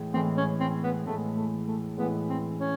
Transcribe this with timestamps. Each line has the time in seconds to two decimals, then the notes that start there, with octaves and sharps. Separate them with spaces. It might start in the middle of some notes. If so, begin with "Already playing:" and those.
Already playing: A2 E3 G#3
0.14 A2 E3 G#3 C4
0.37 C#4
0.60 C4
0.83 B3
1.06 A2 E3 G#3 A3
1.36 A3
1.67 A3
1.98 A2 E3 G#3 B3
2.29 C4
2.59 C#4